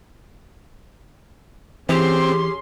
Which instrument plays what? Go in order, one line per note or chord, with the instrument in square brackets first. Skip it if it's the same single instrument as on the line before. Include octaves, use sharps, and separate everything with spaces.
[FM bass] E3 [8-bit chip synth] C4 [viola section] C#4 G#4 C6 [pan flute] G4